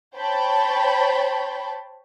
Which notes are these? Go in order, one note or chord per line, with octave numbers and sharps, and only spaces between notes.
C5 C#5 G5 A5 B5